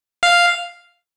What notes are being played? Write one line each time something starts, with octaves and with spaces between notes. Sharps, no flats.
F5